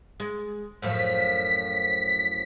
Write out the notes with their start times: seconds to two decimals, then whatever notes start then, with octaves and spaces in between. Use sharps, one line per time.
0.20 G#3
0.82 F#2 A2 F3 B6